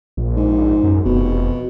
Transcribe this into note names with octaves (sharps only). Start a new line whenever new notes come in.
A#1
G#2
F#2
F1 B2